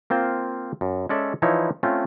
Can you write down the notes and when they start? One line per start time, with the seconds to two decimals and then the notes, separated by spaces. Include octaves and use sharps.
0.10 A#3 C4 F4 C5
0.81 F#2
1.09 G#3 C#4 A4 D5 E5
1.42 E3 F3 D#4 E4 C#5
1.83 A3 C4 C#4 F4